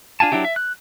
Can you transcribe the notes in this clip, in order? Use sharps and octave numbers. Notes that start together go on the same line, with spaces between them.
D4 F4 G#5 A5
F#3 D4 E4 G4
E5
F#6